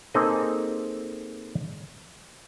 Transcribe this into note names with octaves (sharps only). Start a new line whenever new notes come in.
A#3 C4 D#4 G#4 A4 D#5